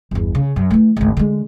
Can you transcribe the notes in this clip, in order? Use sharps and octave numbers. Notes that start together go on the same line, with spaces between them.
G1 E2
C#3
F#2
E3 A3
G#1 D2
D3 G#3